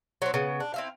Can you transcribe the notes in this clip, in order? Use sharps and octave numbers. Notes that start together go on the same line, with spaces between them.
F#3 C4
C#3 B3
D4
C4 E4 F5